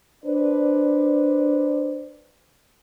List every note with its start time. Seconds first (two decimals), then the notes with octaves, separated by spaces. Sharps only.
0.25 D4 B4 C5 D5